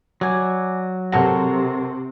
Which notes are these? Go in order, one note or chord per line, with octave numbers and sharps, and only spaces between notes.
F#3 D5 G#5
C3 F#4 A4 A#4